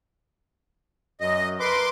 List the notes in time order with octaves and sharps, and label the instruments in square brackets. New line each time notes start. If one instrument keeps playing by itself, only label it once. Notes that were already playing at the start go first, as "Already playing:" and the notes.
[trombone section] F#2 [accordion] D#5
[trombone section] A#4 B4 [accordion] C6 D6